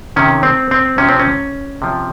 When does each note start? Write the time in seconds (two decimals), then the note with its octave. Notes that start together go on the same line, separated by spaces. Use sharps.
0.16 C3 D#3 C#4
0.43 C4
0.71 C4
0.98 C3 F3 C#4
1.09 C4
1.19 C#4
1.82 C3 F3